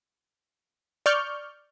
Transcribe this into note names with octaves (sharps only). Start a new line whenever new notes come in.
D5 C#6 F6 G6